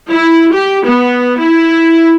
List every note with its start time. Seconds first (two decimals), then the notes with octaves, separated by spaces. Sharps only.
0.10 E4
0.54 G4
0.85 B3
1.40 E4